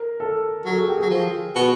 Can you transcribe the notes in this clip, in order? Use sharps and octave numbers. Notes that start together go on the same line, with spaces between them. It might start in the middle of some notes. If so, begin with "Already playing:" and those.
Already playing: A#4
A4
F#3 A4
G#4
G4
F#3 G#4
F3
B2